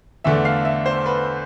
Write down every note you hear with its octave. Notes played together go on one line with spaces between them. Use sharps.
E2 D3 A3 E5
F5
E5
C5
B4